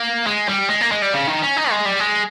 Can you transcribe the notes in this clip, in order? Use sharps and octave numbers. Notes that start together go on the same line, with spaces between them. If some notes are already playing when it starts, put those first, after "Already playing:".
Already playing: A#3
G#3
G3
G#3
A#3
G#3
G3
C#3
D#3
C#4
D#4
G#3
G3
G#3